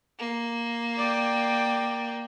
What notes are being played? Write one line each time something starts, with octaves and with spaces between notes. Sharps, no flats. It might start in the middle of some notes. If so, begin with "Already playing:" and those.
A#3
D5 G5